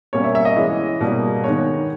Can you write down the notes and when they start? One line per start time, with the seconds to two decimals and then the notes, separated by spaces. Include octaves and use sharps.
0.13 B2 G3 A#3 C#4 C#5
0.24 E5
0.35 E5
0.45 D#5
0.57 E3 G#3 C#4
1.01 B2 G3 A#3
1.44 D#3 G#3 B3 C#5